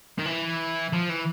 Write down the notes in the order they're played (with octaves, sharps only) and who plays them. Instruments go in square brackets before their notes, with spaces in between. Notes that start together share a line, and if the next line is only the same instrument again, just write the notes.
[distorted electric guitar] D#3
E3
F3
E3